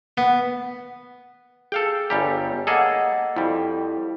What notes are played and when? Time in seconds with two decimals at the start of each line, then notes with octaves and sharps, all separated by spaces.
0.18 B3
1.72 G#4 A4 F5 G5
2.10 G1 G3 G4 C#5 G#5 A#5
2.67 A#3 G#4 A4 D#5 F#5
3.36 F2 G3 E4